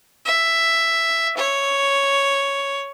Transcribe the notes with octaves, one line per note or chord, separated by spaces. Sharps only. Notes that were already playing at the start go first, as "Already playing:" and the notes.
E5
C#5